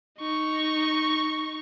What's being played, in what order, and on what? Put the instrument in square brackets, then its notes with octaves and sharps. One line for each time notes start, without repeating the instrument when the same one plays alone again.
[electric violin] D#4 C#6